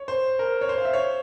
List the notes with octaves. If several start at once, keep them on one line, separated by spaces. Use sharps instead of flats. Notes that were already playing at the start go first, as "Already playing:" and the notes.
Already playing: C#5
C5
A#4
C#5
C5
F5
E5
C#5